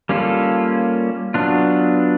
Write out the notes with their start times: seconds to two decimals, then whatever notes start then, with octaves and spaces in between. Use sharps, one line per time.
0.09 G3 A#3 C#4 F4 A4
1.34 F#3 B3 D4 F4